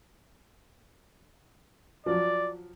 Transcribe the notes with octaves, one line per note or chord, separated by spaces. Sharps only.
F3 F#3 D5